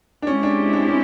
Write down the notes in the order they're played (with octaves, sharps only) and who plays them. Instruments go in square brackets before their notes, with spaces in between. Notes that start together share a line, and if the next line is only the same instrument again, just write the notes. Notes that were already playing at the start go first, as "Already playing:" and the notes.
[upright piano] D4
[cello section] G#3 C4 E4 G4 [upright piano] C#4
[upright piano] D4
D4
C#4